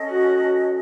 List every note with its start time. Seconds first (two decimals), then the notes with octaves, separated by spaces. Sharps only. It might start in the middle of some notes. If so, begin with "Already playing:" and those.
Already playing: C#4 A4 D#5
0.08 F#4